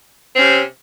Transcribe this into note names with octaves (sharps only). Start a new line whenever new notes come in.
C3 C4 C#4